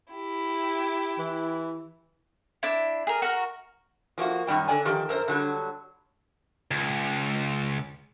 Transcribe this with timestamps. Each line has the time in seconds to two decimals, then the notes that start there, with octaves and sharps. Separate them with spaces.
0.12 E4 G4
1.18 E3
2.63 D4 E4
3.07 G#4 A#4
3.22 F#4 A#4
4.18 F3 A#3 F4 F#4
4.47 F#2 D#3 G3 G5
4.68 D3 D5 G#5
4.85 D#3 F3 G4
5.09 F#2 A#4 C5
5.28 D3 F#3 G3
6.71 C#2